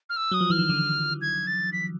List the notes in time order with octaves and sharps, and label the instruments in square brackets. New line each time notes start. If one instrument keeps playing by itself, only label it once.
[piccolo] F6
E6
[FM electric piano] F#3 [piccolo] D#6
[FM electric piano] F3
[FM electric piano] E3 [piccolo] F6
[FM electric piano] D#3
D3
[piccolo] G#6
A6
B6